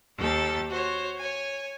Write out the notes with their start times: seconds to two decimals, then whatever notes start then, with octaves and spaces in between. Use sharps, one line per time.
0.17 D#2 G4 A4 A6
0.69 F#4 C5 C#5
1.17 C#5 G#5